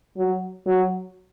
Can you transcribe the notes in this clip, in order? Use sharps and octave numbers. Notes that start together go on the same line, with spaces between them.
F#3
F#3